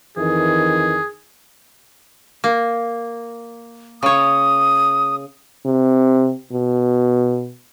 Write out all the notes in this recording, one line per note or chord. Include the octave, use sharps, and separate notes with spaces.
F2 D#3 E3 G#4
A#3
C#3 C#5 D#6
C3
B2